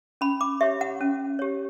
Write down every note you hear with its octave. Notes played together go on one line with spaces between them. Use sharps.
C#4 B5
D6
G4 C#5 E5
F#5
C#4
G4 C#5